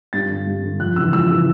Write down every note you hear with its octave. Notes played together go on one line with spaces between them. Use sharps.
G2 A6
D3
G2
D3
F2 F#6
C#3 E3 E6
F2 E6
C#3 E3